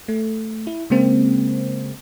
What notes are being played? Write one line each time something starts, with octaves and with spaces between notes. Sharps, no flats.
A3
E4
C#3 G#3 A#3 C4